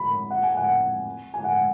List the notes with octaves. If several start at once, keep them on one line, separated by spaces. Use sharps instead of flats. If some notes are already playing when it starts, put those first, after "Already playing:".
Already playing: B5
F#5
G#5
F#5
G#5
F#5